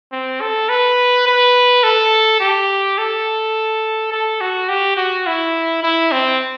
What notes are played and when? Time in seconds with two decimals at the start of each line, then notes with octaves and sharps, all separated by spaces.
0.12 C4
0.41 A4
0.69 B4
1.27 B4
1.84 A4
2.40 G4
2.98 A4
4.12 A4
4.41 F#4
4.69 G4
4.97 F#4
5.27 E4
5.83 E4
6.12 C4